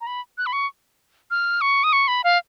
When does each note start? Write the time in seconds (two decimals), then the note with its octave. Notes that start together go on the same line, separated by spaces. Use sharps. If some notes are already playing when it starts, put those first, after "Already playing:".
0.01 A#5
0.07 B5
0.38 F#6
0.46 B5
0.53 C#6
1.31 F6
1.61 C#6
1.84 D#6
1.93 C#6
2.08 B5
2.24 F5